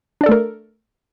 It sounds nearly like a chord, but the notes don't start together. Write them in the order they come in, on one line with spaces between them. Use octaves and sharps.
D4 D5 A4 A3 A#4